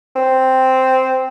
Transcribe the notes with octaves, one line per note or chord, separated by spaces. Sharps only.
C4